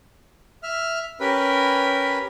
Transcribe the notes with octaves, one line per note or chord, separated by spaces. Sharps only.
E5 F6
C#4 G4 A#4 B4 B5